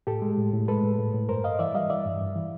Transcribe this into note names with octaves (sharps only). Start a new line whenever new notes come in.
A2 G4 A4
G#3
A2
A2
G#3 A4 B4
A2
A2
A2
G2 A#4 C5
G2 D#5 F5
E3 D5 E5
G3 D#5 F5
E3 D5 E5
G2
G2
E3